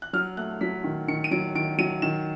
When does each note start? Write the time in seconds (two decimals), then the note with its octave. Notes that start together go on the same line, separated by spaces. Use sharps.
0.02 F#6
0.13 F#3 F6
0.37 A3 F#6
0.61 F#3 B6
0.84 D#3
1.08 D#3 C#7
1.24 D#7
1.31 F#3 D7
1.55 D#3 D7
1.78 F#3 D#7
2.02 D#3 E7